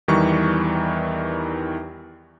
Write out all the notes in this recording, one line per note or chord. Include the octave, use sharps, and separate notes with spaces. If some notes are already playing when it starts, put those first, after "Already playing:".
E2 D#3 E3 G3 C#6